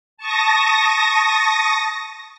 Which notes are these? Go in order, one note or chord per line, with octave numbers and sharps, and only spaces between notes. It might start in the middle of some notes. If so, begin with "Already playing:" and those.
A5 C#6 D#6 A#6